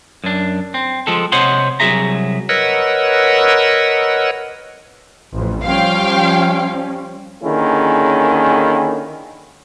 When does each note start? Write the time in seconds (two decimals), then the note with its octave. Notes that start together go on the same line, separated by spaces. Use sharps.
0.24 F#2 D4
0.74 C4
1.07 F3 G#3 A4
1.32 C3 C5 C#5 D#5 F#5 C6
1.80 C2 F2 F#3 G#4 E5 A#5
2.49 A#4 B4 C#5 D#5 F#5 E6
5.35 A1 F2
5.65 F3 G3 C#4 F5 G5
7.43 D3 D#3 A#3 C#4 E4 G#4